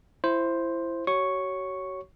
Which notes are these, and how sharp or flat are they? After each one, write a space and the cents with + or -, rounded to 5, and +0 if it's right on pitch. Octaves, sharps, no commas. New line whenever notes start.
E4 +20 C5 +5
F#4 +40 C#5 +0 C#6 +0